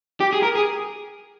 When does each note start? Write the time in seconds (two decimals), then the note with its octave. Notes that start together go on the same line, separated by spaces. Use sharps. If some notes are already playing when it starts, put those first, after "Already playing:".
0.20 G4
0.33 G#4
0.43 A#4
0.55 G#4